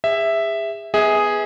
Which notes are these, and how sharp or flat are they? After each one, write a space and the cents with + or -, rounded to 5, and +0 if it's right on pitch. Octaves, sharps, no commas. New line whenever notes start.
G#4 -35 E5 +0
B3 +0 G#4 +0 E5 -40